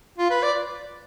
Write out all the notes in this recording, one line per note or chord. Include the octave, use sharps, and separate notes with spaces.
F4
B4
D5